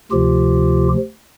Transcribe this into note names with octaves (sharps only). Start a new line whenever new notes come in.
D2 C3 F3 F4 G4